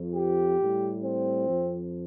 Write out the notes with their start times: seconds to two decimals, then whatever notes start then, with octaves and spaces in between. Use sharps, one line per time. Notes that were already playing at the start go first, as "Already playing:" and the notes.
Already playing: F2 F3
0.16 G4
0.60 A2 G3
1.03 C4
1.48 F2 F3